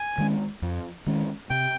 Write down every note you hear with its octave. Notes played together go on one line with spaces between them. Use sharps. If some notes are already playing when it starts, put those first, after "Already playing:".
Already playing: G#5
D#3 G#3 C#4
F2
D#3 G#3 C#4
C3 G5